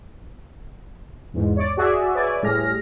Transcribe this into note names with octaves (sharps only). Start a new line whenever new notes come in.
E2 G#2
C#5 D5
F#4 G#4 D5 E5
B4 C#5 D5 E5 G#5
A2 G3 G#4 F6 A#6